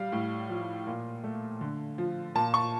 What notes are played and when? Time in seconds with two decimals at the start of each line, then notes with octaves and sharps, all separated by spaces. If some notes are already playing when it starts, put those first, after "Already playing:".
Already playing: G3 F5
0.12 A2
0.49 F3
0.87 A#2
1.24 A3
1.61 D3
1.98 F3
2.35 A#2 A5
2.54 C#6